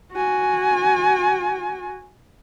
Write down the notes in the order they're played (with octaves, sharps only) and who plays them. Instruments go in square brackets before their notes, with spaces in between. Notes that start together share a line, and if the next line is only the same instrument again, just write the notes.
[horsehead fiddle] F#4 G#5